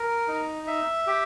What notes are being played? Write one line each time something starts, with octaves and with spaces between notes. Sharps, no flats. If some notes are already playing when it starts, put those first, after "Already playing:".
Already playing: A#4
D#4
E5
G4